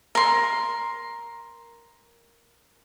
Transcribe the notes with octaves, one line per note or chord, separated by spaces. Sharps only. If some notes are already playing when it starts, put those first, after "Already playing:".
A#4 C6